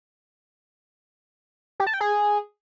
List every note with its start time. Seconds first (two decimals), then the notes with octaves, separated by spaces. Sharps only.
1.80 G4
1.87 A5
1.94 G5
2.01 G#4